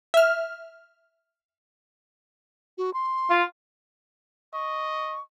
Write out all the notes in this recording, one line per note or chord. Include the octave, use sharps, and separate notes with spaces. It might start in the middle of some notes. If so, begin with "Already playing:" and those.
E5 F6
F#4
C6
F4
D#5 C#6